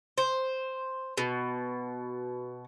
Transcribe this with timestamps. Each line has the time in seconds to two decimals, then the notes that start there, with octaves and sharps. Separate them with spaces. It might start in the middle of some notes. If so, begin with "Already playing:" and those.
0.18 C5
1.18 B2